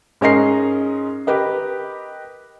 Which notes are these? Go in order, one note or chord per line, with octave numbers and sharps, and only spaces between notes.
G#2 C#4 A#4 D#5 C7
G4 A#4 B4 D#5